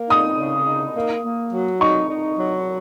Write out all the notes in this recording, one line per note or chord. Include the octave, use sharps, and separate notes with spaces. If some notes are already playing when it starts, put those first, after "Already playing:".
Already playing: A#3
D#4 D#6
C#3
D#4
A#3
A#3
F#3
D#4 C#6
D#4
F#3